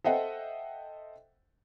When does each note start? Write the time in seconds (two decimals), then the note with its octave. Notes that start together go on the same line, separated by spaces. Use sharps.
0.04 A4 C5 D#5 E5 F#5 G5